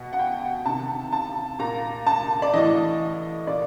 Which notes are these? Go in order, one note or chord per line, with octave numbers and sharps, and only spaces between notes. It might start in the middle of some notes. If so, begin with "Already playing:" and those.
Already playing: B2 F#5
F#5
G5
C3 D#3 A5
A5
A#2 A#5
A5
D5
A2 E3 D#5
A#2 D5